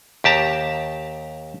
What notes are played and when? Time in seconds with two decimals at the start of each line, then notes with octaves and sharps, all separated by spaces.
0.24 D#2 G4 A5 A#5